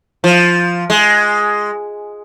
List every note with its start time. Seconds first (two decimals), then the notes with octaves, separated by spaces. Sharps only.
0.24 F3
0.90 G#3